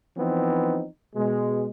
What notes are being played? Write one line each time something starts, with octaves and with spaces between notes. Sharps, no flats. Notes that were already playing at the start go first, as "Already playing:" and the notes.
E3 F3 B3 C4 D#4
B2 G#3